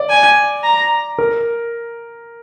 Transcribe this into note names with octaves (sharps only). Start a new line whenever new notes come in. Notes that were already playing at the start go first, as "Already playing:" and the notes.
Already playing: D5
G#5
A#5
A#4